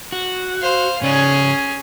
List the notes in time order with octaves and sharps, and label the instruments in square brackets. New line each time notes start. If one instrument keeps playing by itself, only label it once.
[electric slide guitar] F#4
[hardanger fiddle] C5 F5
[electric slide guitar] G#2 C#3 D5 [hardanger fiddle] C#4 G#4